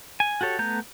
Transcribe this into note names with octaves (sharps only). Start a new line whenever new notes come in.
G#5
F#4 G4 A4 C#5
A3 B3 A#5 G6